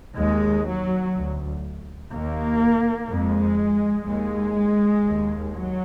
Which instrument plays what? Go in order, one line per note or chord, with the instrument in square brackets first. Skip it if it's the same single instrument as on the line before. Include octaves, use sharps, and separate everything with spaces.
[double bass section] D#2 G#3
F#3
D2
D#2 A#3
F2 G#3
D#2 G#3
D#2
F#3